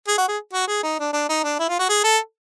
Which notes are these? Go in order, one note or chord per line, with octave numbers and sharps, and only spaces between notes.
G#4
F#4
G#4
F#4
G#4
D#4
D4
D4
D#4
D4
E4
F4
F#4
G#4
A4